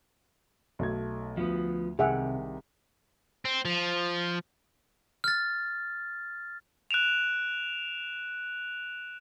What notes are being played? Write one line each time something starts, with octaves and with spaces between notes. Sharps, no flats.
B1 A3 G#6
D2 F3 B3
C2 C3 D#3 G#4 E5 F#5
C4
F3
F6 A6
F#6 D7 E7 F7